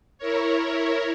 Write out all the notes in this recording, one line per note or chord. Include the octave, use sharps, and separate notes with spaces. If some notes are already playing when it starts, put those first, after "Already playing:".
E4 A#4 C#5